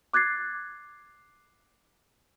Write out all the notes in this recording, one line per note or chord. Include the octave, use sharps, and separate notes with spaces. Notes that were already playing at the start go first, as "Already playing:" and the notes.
D6 F#6 G#6 A6 C7